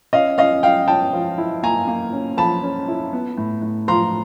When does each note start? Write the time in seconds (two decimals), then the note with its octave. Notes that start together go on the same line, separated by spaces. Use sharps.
0.13 C#4 D#5 F5
0.38 C#4 D#5 F5
0.63 C#4 F5 G5
0.88 C#4 G5 A5
1.13 F3
1.38 E4
1.63 A#3 G#5 A#5
1.87 A#3
2.13 C#4
2.37 F3 A5 B5
2.63 C#4
2.88 E4
3.13 B3
3.38 A2
3.62 A2
3.88 F3 A#5 C6